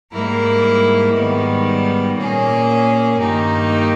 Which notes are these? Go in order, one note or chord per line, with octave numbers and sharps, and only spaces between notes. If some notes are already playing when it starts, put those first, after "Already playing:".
G#2 G3 A#3 E4 A#4
G#2 D#3 G3 B3
A#2 A#3 C#4 G#4
G2 D#3 A#3 D#4 G4